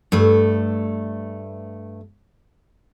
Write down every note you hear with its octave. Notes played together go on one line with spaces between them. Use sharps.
G2 A3